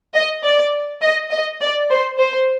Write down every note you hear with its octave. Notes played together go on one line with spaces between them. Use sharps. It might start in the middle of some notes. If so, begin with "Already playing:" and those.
D#5
D5
D#5
D#5
D5
C5
C5